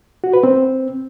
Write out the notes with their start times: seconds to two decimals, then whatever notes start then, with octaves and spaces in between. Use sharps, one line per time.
0.24 F#4
0.34 B4
0.43 C4